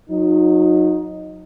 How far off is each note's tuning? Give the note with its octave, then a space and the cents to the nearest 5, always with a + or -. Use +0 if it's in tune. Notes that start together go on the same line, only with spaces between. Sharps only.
F#3 -35 D#4 +0